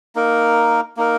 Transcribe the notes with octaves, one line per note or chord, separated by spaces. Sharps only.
A#3 D#4 A#4
A#3 D#4 A#4